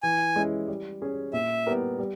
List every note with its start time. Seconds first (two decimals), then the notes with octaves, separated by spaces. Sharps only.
0.03 E3 G#5
0.36 G#3 C#4 E4
0.68 G3
1.02 C#4 G#4
1.33 A#2 E5
1.67 G3 B3 G4 A#4
1.99 G3